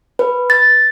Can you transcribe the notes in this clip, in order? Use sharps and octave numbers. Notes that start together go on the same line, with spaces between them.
B4
A6